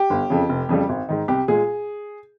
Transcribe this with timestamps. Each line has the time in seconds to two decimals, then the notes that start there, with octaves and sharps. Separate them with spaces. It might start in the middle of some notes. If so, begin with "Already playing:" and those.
Already playing: G4
0.10 G1
0.30 F2 C#3
0.49 F1
0.69 F2 C#3 G3
0.89 G#1
1.09 G#2 D#3
1.28 C2 G4
1.48 A#2 G#3 G#4